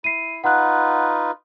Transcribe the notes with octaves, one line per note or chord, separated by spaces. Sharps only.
E4 C7 D#7
D#4 F4 B4 F#5 F#6